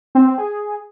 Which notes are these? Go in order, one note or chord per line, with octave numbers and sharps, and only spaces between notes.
C4
C4
G#4